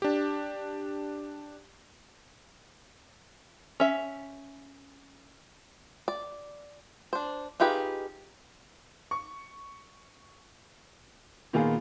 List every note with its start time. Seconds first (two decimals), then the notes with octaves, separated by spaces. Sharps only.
0.02 D4 G4
3.80 C#4 E5
6.08 D5
7.13 D4 C5
7.60 D#4 F4 G4 G#4 B4
9.11 C#6
11.53 A#2 D#3 B3 F4 G#4